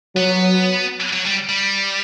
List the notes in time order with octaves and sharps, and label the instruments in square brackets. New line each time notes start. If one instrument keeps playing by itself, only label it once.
[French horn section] F#3 [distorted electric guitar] B3
[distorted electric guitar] F#3
G3
G3